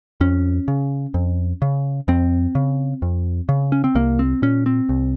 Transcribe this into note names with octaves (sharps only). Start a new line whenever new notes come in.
F2 C#4
C#3
F2
C#3
F2 C4
C#3
F2
C#3
C#4
C4
C2 A#3
C4
A#2 C#4
C4
C2